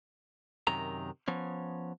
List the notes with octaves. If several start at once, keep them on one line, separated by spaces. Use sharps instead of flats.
F#2 C3 D#3 A#5
F3 B3 C#4